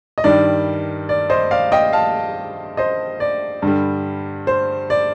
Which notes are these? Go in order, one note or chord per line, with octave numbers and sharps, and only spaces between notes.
D#5
G2 D#3 G3 D5
D5
C5 D#5
D5 F5
D#5 G5
F5 A5
C5 D#5
D5
G2 D3 G3
C5
D5